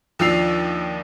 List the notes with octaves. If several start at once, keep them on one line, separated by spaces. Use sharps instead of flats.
D#2 F3 D4 E6 C7 F7